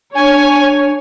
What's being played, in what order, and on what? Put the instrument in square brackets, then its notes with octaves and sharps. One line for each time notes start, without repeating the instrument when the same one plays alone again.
[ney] D4 [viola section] C#5 [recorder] G#5